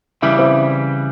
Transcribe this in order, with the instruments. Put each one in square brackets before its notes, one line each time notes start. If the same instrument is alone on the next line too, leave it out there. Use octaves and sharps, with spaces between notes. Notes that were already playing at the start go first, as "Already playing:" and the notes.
[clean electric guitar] C#3 E3 G3 [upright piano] E4
[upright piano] C#4
C4 E4